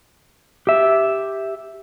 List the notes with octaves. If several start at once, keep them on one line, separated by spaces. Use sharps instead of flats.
G4 E5